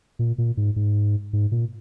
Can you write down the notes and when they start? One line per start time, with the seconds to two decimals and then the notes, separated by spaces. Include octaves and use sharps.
0.19 A#2
0.38 A#2
0.57 G#2
0.76 G#2
1.33 G#2
1.52 A#2